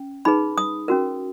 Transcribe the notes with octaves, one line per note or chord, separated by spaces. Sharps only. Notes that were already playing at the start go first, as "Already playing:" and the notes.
Already playing: C#4
D#4 G#4 B4 B5
D#6
C#4 F#4 A#4